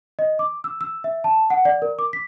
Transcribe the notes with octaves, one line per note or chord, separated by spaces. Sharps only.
D#5
D6
E6
E6
E5
A5
F#5
D5
A#4
D6
B6